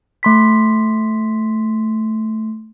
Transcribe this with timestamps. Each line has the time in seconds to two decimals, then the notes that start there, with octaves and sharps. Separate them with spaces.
0.23 A3 C6 B6